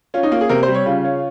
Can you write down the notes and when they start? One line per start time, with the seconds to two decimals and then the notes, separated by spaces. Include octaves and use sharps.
0.14 C#4 F4
0.23 D#4
0.32 A#3 F4
0.41 G#4
0.49 C3 A#4
0.63 C5
0.68 G3
0.75 C#5
0.86 C#3 F4
1.04 C#4